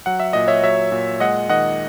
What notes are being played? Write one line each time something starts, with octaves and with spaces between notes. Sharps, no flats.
F#3 F#5
E5
A#2 D#5
C#5 E5
F#3 C#5 E5
A#2
G#3 D#5 F#5
D#3 D#5 F#5